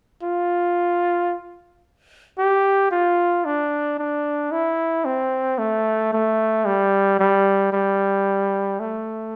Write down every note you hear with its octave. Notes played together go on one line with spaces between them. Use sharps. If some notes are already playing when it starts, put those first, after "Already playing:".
F4
G4
F4
D4
D4
E4
C4
A3
A3
G3
G3
G3
A3